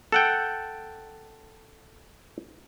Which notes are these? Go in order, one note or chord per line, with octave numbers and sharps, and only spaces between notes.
A4 F#5 G5